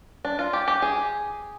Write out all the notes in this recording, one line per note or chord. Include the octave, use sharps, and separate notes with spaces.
D4
F4
G4
G4
G#4